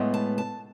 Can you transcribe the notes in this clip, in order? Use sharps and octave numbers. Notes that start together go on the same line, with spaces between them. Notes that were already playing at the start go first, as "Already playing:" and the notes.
Already playing: A2 G#3 B3
A5
A5